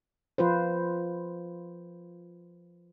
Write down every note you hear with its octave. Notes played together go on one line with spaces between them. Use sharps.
F3 F4 B4 C5